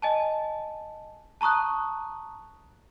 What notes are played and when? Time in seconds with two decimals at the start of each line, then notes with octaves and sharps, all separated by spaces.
0.02 D#5 G#5 A5
1.41 A5 A#5 C#6 D#6 F#6